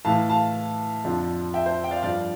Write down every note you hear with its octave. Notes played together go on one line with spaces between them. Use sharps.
A2 E3 F5 A5
F5 A5
F2 D3 F3
E5 G5
C5 E5
G5
D5 F5
G2 F3 D5 F5